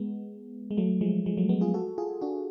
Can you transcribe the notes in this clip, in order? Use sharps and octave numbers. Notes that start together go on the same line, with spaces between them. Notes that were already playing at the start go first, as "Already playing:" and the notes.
Already playing: G#3 B3
G#3
F#3 A3
F3 G#3
F3 G#3
F#3 A3
G#3 B3
F4 G#4
F#4 A4
F4 G#4
D4 F#4